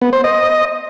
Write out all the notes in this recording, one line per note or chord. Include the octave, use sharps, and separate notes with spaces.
B3
C5
D#5